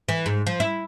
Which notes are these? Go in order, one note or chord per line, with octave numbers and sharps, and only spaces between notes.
E3
G#2
F3
E4